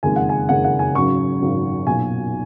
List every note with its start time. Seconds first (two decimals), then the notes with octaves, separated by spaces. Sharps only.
0.03 F#1 F2 D#3 G#3 G#5
0.16 F#5
0.29 G#5
0.49 F#1 F2 D#3 G#3 F#5
0.64 F#5
0.79 G#5
0.94 G#1 F#2 C#3 F#3 C#6
1.40 G#1 F#2 C#3 F#3
1.87 B1 A#2 F#3 G#5